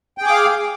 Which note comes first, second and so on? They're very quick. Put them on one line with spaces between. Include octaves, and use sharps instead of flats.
G5 G#4 D6 F5